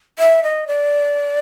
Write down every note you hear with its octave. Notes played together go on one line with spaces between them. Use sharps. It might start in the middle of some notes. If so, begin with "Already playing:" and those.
E5
D#5
D5